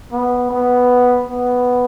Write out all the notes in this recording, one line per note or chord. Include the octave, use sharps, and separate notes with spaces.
B3
B3
B3